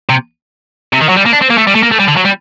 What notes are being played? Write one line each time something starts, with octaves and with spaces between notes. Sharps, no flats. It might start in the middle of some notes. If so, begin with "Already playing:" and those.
C3
C3
D#3
F#3
G3
A#3
D4
C4
A#3
A3
G3
A3
A#3
A3
G3
D3
F#3
G3